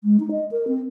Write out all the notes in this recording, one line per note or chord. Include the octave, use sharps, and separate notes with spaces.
G#3
D#4
D#5
A#4
C4